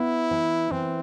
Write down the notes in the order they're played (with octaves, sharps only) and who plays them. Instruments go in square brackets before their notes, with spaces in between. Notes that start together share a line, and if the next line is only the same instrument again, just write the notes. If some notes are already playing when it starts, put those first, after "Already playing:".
Already playing: [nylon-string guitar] B3 [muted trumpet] E4
[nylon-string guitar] E3
[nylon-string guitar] E3 [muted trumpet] C4